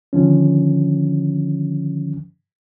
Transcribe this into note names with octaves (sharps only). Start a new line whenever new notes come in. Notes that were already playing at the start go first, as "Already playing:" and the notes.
D3 D#3 F3 C#4